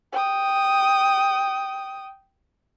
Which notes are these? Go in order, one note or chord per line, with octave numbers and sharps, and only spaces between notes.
G5 D#6